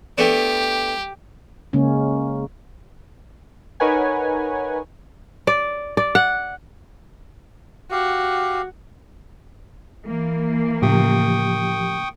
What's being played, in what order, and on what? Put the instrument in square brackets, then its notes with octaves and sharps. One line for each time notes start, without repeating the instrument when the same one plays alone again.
[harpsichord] A3 B3 D4 [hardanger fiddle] G4
[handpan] C#3 G#3 A#3 C#4
[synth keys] D#4 A#4 B4 C#5 F#5 G#5
[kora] D5
D5
F#5
[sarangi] F#4 [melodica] G4 F5
[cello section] E3 A#3
[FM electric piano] A2 C#3 [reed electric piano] F3 G4 [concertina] G5 C#6 D#6